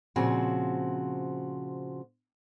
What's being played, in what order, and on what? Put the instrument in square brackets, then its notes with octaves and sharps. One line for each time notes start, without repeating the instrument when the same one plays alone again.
[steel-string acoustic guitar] A#2 C#3 F3 C4 F#4